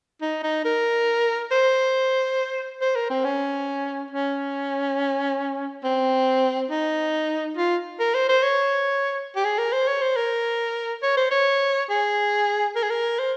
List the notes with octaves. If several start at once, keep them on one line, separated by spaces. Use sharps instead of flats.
D#4
D#4
A#4
C5
C5
A#4
C4
C#4
C#4
C4
D#4
F4
A#4
C5
C5
C#5
G4
G#4
A#4
C5
C#5
C5
A#4
C#5
C5
C#5
G#4
A#4
G#4
A#4
C5